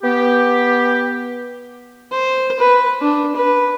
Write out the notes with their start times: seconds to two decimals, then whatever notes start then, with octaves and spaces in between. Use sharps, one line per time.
0.04 B3 G4
2.12 C5
2.59 B4
3.01 D4
3.36 B4